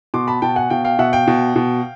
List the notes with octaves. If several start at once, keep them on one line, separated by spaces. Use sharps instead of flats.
B2 C6 D6
A5 B5
B2 G5 A5
F#5 G#5
B2 F5 G5
F5 G5
B2 E5 F#5
F5 G5
B2
B2